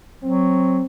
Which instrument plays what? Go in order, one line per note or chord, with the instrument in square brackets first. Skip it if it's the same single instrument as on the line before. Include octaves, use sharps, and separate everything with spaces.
[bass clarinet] F#3 [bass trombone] C4